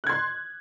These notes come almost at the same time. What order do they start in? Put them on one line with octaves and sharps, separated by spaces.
F#6 G#6 C6